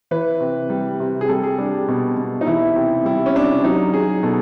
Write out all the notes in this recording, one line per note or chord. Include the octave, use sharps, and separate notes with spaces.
E3 B4
C3
G3
C3
G#4
G3 A4
G#4
G3 D4
B2
B2
D#4
E3 E4
C3
G3 E4
C#4
C3 D4
F#3 D#4
F#3 G#4
B2 A4